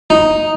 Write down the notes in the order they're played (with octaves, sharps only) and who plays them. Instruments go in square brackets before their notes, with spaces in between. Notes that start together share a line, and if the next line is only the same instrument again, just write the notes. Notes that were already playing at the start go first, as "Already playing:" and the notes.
[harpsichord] D#4